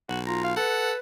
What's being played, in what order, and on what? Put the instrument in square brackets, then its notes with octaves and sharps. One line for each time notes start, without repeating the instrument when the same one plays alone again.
[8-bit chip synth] B1 [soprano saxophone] F#4
[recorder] F4 [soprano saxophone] A#5
[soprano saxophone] F5
[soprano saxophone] A4 [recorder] B4 [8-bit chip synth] F#5